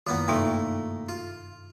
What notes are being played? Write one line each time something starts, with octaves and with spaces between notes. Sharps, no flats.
F#2 D#3 A#3 B3 F4
G2 C3 A3 A#3 D#4
F4